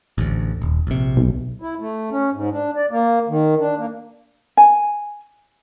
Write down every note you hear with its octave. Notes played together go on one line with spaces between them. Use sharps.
A1 D2
D#1
A#1 C3
B1
E4
A3
C#4
G#2
D4
D5
A#3
D#3
D4
A#3
G#5